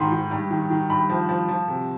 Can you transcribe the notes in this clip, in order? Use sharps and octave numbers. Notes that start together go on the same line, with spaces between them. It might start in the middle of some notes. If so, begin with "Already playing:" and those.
Already playing: G#2 D#3 B5 C6
D#3
G2
D#3
D#3
G2 B5
F3
F3
F3
C3